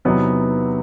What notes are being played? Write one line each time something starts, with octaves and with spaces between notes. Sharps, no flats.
E2 C3 F#3 B3 D#4